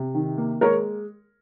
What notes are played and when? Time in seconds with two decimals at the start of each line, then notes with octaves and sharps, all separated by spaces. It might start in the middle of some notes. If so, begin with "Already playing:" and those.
Already playing: C3
0.14 D#3
0.38 A#3
0.61 G#3 A#4 C#5